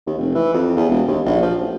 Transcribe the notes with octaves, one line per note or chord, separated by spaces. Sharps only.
D#2
F1
E3
F2
E2
E1
D#2
A#1
F3
A1